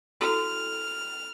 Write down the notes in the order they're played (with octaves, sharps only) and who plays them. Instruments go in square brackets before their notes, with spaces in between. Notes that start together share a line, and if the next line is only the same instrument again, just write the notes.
[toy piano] E4 F#4 A4 [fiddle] F6